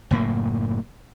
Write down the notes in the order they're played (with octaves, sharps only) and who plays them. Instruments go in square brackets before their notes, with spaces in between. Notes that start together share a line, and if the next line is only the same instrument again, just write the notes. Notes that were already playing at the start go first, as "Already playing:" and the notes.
[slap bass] F#1 A2 A#3